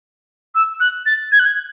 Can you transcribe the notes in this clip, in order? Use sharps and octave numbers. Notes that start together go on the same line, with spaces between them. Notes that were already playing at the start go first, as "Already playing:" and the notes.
E6
F#6
A6
G#6
F#6
G#6